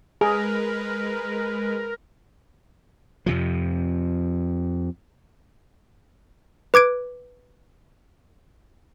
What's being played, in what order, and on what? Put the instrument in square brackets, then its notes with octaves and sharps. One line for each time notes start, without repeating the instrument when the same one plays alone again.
[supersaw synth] G#3 B4 [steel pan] G#4 [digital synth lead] A#4
[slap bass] F2 C3 F3
[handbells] B4 D6 G#6 D7